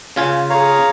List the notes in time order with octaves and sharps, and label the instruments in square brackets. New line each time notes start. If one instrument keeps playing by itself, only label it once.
[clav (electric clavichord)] C#3 F4 G#5
[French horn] G#4 [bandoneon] C#5 F5 A#5